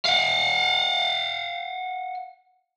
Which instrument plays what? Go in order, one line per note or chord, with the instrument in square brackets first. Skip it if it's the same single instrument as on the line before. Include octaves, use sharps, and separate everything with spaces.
[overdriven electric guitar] F5 F#5